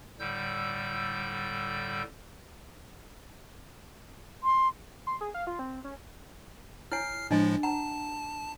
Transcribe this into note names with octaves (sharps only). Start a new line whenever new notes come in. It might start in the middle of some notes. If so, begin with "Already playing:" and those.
A2 D3 G3 E6 G6
C6
C6
G#4
F5
F4
C4
C#4
E4 C#5 G#5 F6 C7
A2 F3 G#3 D4 D#5 G#5
F#5 A5 A#5